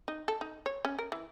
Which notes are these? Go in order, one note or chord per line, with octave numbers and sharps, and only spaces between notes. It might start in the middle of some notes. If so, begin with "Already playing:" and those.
D#4
A4
D#4
C#5
C#4
A#4
E3